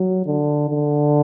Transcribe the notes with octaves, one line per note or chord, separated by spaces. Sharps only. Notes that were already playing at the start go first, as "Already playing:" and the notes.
Already playing: F#3
D3
D3